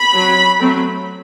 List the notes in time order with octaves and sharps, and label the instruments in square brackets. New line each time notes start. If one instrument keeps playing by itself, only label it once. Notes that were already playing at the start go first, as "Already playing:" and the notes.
Already playing: [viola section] B5
F#3 C4
F#3 A3 C4